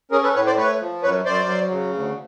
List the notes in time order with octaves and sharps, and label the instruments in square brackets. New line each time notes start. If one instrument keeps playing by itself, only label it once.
[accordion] C#4 G#4 A#4
A4 B4
A2 B4 C#5
C5 D5
A3 B4 C#5
F3
F#2 B4 C#5
F#2 C5 D5
F#3
C#3
D2